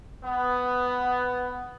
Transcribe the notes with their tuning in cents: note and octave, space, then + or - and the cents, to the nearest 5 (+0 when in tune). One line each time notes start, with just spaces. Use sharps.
B3 +10